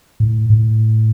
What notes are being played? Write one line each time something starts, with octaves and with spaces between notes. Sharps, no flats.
A2
A2